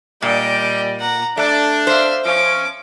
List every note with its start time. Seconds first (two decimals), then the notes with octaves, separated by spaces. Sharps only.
0.22 A#2 G3 D5 D#5 G5
1.00 F#5 A#5
1.37 A3 D4 D6
1.87 C5 E5 F5
2.25 F3 C#4 D6